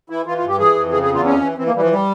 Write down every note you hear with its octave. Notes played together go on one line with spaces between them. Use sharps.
E3 E4
E3 F4
F4
G2
G4
E3 G#4
F2
C#3 G#4
G#4
E2
F4
F2 C#4
E3
E3 C4
A#3
E3 G3
F3
G3